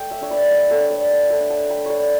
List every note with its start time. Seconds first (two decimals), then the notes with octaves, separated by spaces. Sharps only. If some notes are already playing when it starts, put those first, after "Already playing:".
Already playing: A3 G5
0.11 C#5 E5
0.21 D4 C#5
0.31 B4 D5
0.51 A3 B4 D5
0.71 A4 C#5
0.80 D4
0.90 B4 D5
1.11 A3
1.30 A4 C#5
1.40 D4
1.50 F#5 A5
1.69 A3 G5 B5
1.86 B4 C#5 D5
1.99 D4